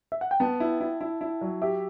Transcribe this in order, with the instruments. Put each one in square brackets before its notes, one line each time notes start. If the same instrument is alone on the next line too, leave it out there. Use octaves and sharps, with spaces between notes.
[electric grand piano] E5
F#5
G5
[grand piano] B3 [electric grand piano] A5
[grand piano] E4
E4
E4
E4
F#3
[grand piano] G4 [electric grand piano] E5